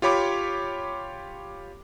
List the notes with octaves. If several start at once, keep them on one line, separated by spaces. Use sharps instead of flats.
F4 G4 C#5 B5 D6